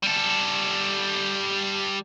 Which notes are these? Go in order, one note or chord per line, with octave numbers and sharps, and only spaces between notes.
G3 A4